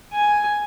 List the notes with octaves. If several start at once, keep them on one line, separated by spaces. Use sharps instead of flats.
G#5